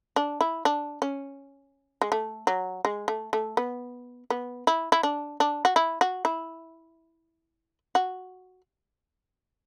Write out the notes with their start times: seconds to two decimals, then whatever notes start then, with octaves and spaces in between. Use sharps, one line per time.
0.16 D4
0.41 E4
0.65 D4
1.02 C#4
2.02 G#3
2.12 A3
2.47 F#3
2.85 G#3
3.08 A3
3.33 A3
3.57 B3
4.30 B3
4.67 E4
4.92 E4
5.03 D4
5.40 D4
5.65 F#4
5.76 E4
6.01 F#4
6.25 E4
7.95 F#4